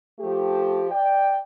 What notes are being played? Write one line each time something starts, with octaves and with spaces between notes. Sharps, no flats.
F3 A3 G4
D5 G5